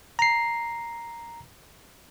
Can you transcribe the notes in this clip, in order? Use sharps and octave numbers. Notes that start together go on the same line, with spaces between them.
A#5 C7